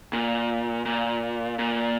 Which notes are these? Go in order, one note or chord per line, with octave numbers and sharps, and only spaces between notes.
A#2
A#2
A#2